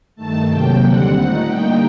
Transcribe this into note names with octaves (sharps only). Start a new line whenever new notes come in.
G2 D#3 A3 A5
C3 F#3 A#3 G5
D#2 D3 G3 C4 F#5
A#2 A3 D#4
D3 G3 A#3 D#4 G5